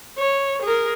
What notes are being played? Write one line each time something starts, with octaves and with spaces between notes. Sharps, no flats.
C#5
G#4 A#4